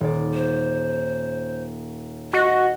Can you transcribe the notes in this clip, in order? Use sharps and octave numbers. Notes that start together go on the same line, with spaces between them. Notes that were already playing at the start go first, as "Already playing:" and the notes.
D#1 D5
C5
F#4 D#5